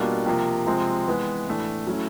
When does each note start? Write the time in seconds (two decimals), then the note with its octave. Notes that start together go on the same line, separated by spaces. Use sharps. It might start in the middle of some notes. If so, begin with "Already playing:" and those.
Already playing: B2 G3 A#3 D4 F4
0.26 C3 F3 A#3
0.66 C3 F3 G#3 C4
1.06 E3 G#3 B3
1.47 A2 E3 A3 D4
1.87 F#3 A3 C#4 E4